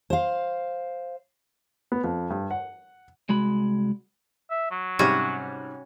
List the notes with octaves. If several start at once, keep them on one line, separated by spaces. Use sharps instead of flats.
C5 F5
B3
F2
G2
F#5
C2 G#3 F#4 B5
E5
F#3
G#2 C3 G3 C#4 F#4